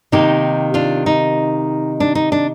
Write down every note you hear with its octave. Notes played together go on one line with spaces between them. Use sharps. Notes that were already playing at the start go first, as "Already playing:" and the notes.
C3 D#3 A#3 D#4 G4
D4 F4
D#4
D4
D#4
D4